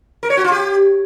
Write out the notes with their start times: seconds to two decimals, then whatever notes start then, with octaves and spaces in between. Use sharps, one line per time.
0.23 A#4
0.30 C#5
0.37 F#4
0.44 F4
0.52 G4